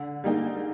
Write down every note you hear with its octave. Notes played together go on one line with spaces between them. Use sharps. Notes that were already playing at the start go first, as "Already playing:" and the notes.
Already playing: D3
G3 A#3 D#4 G#4